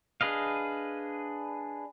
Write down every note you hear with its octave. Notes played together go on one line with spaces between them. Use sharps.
D4 G#4 B4 D#5 F5